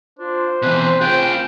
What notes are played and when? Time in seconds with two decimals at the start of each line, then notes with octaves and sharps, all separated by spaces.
0.19 D4 F4 C5
0.62 B2 E3 C4 B4
1.01 C4 F4 G#4 G5